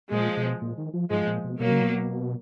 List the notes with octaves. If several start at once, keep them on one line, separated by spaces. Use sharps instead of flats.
A#2 F3 G#3
B2
A#2
D#3
F3
G#2 F3 G#3
A#2
B2
B2 F#3 A#3
C#3
B2